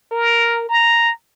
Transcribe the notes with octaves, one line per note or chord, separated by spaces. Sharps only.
A#4
A#5